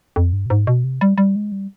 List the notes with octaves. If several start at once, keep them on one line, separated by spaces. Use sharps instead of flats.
F2
G2
B2
G#2
B2
C3
G3
G3
G#3
G3